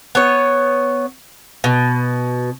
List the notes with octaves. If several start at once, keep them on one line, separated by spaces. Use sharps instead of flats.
B3 C#5
B2